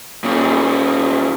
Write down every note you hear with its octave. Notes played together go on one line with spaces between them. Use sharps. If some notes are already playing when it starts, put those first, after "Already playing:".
A#2 C#4